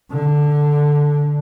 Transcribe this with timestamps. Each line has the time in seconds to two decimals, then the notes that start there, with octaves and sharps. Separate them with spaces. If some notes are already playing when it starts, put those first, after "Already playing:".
0.12 D3